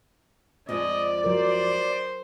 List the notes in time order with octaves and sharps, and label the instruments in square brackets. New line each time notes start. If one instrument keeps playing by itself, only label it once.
[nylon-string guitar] F2 F3 G#3 [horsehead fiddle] D5 [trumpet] D#5
[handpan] F#3 A#4 [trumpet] C5